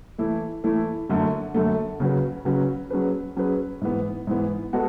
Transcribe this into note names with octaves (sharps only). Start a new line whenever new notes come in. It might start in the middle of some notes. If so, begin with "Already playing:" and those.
E3 A3 E4
E3 A3 E4
F#2 D3 A3
F#2 D3 A3
C#3 F#3 C#4 F#4 B4
C#3 F#3 C#4 F#4 B4
F#3 C#4 G#4 B4
F#3 C#4 G#4 B4
G#2 E3 B3
G#2 E3 B3
G#3 B3 F#4 A4